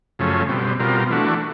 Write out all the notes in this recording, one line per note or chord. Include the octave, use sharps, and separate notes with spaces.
F#2 C#3 F3 A3 C#4
B2 G3 C4
B2 G3 C4 F4 A#4
E3 A3 D4 F#4